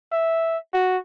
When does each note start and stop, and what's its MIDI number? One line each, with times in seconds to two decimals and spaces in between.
0.12 0.58 76
0.73 0.98 66